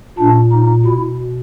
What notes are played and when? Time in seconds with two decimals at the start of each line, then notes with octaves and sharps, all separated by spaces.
0.18 A#2 D4
0.52 D#4
0.85 B2 E4